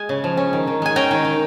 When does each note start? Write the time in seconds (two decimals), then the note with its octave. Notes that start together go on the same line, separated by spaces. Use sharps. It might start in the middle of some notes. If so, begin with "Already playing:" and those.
Already playing: G#3 G#5
0.09 C#3
0.24 F3
0.37 C#4
0.53 D#3
0.67 D#3
0.82 G#3 G#5
0.96 C#4 G5 A#5
1.11 D#3
1.25 D#3